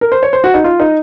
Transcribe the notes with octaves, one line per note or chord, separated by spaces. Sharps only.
A#4
C5
C#5
C5
F#4
D#4
F4
D#4